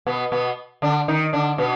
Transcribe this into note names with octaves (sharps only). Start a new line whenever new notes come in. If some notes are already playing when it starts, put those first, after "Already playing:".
B2 B3
B2 B3
D3 D4
D#3 D#4
D3 D4
B2 B3